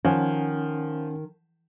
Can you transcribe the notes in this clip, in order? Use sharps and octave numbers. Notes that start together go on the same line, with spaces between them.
D#3 F3 C#4 F#5 G#5